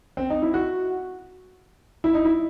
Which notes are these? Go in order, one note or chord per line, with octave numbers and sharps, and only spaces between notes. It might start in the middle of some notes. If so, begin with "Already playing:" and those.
C4
D#4
E4
F#4
E4
D#4
E4